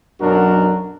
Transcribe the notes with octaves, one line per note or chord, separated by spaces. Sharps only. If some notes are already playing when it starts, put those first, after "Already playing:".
B1 F#2 F#3 D4 F#4 A#4